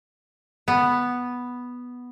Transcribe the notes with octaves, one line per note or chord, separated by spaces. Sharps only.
B3